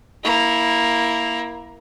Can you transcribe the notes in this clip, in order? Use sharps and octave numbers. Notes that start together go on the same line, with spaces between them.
A#3 E4